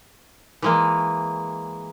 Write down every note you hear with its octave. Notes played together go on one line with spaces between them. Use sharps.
E3 G#3 A#3